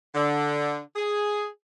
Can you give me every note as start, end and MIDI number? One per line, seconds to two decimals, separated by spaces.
0.15 0.80 50
0.96 1.45 68